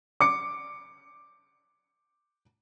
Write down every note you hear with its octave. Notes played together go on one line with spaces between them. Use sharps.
D6 C#7